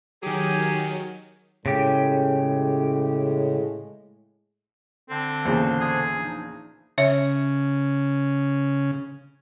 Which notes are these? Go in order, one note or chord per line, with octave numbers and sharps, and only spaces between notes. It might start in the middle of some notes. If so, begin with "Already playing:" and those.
D#3 F#3 G4 G#4
A2 C#3 G#3 G4
D3 C4
E2 A#2 C#3 C5
G#4
F3 D4 D#4
C#3 C#5 E5